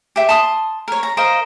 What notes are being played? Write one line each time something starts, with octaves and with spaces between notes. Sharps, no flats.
G4 E5
A5 C6 D#6
A#4 C#5
A#5
A#4 C5 D#5 F5